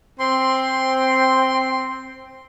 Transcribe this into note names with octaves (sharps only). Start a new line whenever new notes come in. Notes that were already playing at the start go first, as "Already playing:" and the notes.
C4 C6